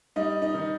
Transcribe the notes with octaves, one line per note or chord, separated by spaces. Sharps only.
G3 D#4 D#5
D#4 D#5
D#3